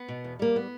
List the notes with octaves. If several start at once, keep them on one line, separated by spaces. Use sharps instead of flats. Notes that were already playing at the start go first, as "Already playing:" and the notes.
Already playing: B3
B2
E2
G3 A#3
B3